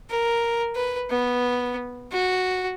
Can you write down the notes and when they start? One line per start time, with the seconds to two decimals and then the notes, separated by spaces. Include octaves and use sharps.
0.10 A#4
0.75 B4
1.10 B3
2.12 F#4